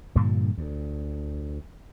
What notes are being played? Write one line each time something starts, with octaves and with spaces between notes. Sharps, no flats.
G2 A#2 D3 F3
D2